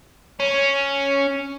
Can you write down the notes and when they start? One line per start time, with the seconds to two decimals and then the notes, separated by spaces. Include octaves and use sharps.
0.40 C#4